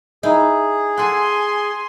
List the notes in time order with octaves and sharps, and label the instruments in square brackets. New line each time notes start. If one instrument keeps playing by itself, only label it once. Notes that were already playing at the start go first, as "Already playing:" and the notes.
[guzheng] D#4 E4 [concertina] G#4
[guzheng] A4 F#5 [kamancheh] G#5 C6